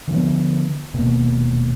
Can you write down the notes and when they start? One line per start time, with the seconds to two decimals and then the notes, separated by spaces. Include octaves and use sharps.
0.08 D3 F3 A#3 B3
0.93 D#1 B2 A#3